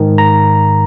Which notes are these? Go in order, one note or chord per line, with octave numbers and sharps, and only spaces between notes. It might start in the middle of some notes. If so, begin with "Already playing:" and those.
Already playing: G#2 D#3
A#5